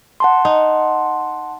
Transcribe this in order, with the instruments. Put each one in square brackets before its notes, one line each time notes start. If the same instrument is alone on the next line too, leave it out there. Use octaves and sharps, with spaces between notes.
[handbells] F#5 A5 C6
[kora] D#4